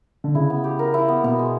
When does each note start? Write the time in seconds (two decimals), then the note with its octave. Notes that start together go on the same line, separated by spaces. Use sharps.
0.24 D3
0.35 C#3 E4
0.50 B3
0.64 G4
0.79 A#4
0.94 E4
1.08 B3
1.24 B2 B3
1.39 G#3